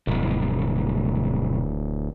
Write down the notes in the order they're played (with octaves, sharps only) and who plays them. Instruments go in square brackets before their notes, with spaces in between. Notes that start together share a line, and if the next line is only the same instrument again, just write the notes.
[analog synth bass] D1 [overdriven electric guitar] B1 G2